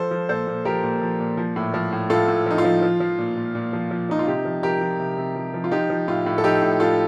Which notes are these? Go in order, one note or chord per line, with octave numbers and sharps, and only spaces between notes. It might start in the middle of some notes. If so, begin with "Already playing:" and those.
Already playing: F3 A4 C5
F3
A#2 A4 C5
A#2
F3 G4 A#4
A#2
F3
A#2
F3
A2
F3
A2
A2 F4 A4
A2
F3 D#4
F4
F3
F3
F3
A#2
A#2
A#2
F3
F3
F3 D#4
F4
C3 D#4 G4
F3
F3 G4 A#4
F3
C3
C3
F3
F3
F4
F3 D#4 G4
F3
A2 F4
A2
A4
F3 D#4 G4
A2
A2 F4 A4